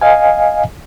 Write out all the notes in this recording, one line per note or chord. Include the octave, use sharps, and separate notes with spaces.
D#5 F5 G#5